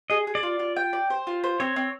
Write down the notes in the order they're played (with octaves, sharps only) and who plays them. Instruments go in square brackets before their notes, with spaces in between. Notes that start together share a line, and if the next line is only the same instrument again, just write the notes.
[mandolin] G#4 [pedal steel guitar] D#5
[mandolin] G#4
[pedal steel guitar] D5
[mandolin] F4
F4
G5
D5
C5
F4
C5
[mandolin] C4 [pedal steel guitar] C#5
[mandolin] C4